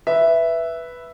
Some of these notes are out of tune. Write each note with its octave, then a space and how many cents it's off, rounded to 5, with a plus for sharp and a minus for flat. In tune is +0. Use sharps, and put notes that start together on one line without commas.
B4 +0 E5 +0